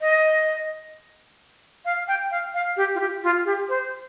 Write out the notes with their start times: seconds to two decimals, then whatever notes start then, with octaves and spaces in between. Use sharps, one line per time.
0.01 D#5
1.85 F5
2.08 G5
2.31 F5
2.54 F5
2.77 G4
2.95 F4
3.00 G4
3.23 F4
3.45 G4
3.69 C5